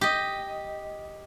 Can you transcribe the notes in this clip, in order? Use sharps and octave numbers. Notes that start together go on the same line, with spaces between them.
G4 D#5